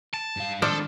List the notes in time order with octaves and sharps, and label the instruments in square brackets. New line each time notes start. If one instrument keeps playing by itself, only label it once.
[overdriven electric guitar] A5
[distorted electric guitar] G2 F5
[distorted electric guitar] D#3 G#3 [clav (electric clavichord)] F3 [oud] D4 [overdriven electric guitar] A4